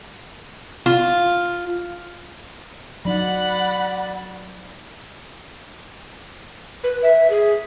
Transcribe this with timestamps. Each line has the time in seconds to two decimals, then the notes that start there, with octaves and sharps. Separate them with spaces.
0.86 F4
3.05 F#3 D#4 D5 F#5 B5
6.84 B4
7.03 E5
7.30 G#4